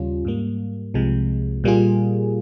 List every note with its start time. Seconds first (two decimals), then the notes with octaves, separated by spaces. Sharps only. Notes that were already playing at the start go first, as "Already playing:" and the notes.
Already playing: D#2 C#3 G3 C#4 F4
0.25 G#2 G3 A#3
0.94 C2 C3 F3 G#3
1.64 A#2 G3 A#3 F4 G#4